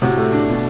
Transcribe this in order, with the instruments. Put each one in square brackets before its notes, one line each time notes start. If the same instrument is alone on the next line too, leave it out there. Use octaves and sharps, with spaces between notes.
[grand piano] A2 C3 [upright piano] F#4
[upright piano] A3
D4
B2